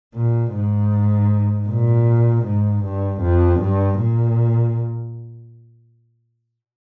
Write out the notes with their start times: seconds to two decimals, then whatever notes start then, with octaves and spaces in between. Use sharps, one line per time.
0.14 A#2
0.53 G#2
1.68 A#2
2.45 G#2
2.84 G2
3.22 F2
3.61 G2
3.99 A#2